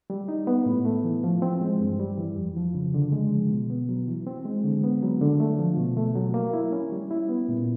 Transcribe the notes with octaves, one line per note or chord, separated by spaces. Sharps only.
G3
D#4
B3
A2
A3
E3
F3
C4
G#3
G2
G3
E3
F2
F3
C#3
D3
G#3
F3
B2
B3
F#3
E3
C4
G#3
D3
B3
F#3
D3
A3
F3
B2
A3
F#3
A#3
E4
C#4
G3
E4
B3
A#2